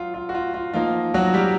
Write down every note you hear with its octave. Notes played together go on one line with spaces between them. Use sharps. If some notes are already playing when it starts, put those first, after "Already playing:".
Already playing: F#3 F4
F4
F#4
F4
F4
F3 A#3 D#4 F4
F#3 F#4
G3 G4